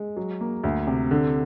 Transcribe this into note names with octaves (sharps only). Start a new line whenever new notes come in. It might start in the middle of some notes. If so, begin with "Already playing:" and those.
Already playing: G#3
F#3
A#3
D2
C3
D3